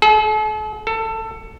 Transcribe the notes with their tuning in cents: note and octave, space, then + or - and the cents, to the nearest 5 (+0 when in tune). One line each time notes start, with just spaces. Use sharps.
A4 -45
A4 +20